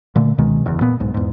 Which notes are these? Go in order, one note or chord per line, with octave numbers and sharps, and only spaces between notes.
A#2 D3 A3
C#2 B2 D#3 G#3
F#1 E2 C#3
A#2 B3
B1 G#2
E2 G#2